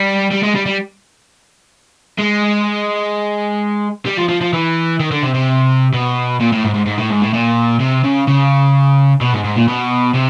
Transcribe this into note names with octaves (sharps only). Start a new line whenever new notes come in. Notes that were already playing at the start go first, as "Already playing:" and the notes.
Already playing: G3
G3
G#3
G3
G3
G#3
G3
F3
F3
F3
E3
D#3
D3
C3
C3
B2
A#2
A2
G#2
G#2
G#2
A2
G#2
A2
A#2
C3
C#3
C#3
B2
G#2
G#2
A#2
B2
C3